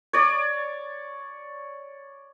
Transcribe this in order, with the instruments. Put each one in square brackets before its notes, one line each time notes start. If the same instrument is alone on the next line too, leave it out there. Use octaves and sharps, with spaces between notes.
[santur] C#5 D5